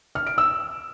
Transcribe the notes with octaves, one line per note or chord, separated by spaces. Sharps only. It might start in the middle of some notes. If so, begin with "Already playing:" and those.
F6
D7
E6